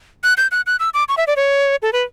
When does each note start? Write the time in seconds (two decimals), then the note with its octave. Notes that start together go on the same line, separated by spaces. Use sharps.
0.24 F#6
0.37 G6
0.52 F#6
0.66 F#6
0.80 E6
0.94 D6
1.09 C#6
1.18 E5
1.27 D5
1.37 C#5
1.82 A4
1.93 B4